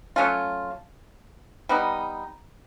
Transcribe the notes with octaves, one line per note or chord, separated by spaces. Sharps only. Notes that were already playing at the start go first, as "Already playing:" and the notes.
F#3 A3 C#4 F4
G3 B3 D#4